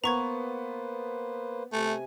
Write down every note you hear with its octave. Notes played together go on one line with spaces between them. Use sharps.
A#3 B3 B4 C5 A#5 C#6 G#6
C3 A3 G#5